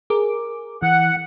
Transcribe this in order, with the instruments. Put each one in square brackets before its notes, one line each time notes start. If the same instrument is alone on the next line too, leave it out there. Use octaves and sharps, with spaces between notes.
[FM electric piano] G#4 A#4 D6
[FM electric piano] E3 [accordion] F#5